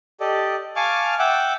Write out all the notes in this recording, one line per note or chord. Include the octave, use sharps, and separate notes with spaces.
G4 A4 D5 D#5
F5 G#5 A5 C#6 D6 F6
E5 F#5 G5 D6